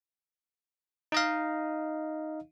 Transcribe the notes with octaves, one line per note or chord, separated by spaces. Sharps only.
D#4 D#5 F5